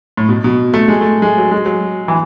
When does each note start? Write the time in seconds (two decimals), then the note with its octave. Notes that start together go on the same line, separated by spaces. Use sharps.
0.17 A2
0.29 B2
0.44 B2
0.74 A3
0.88 G#3
1.01 A3
1.22 G#3
1.38 F#3
1.51 G#3
1.65 F#3
2.08 E3